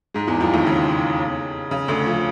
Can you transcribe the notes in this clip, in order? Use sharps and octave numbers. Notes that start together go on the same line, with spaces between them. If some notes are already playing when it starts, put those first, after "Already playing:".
G#2 G#3
E2 E3
F2 F3
D#2 D#3
C#3
C#3
D2 D3
F3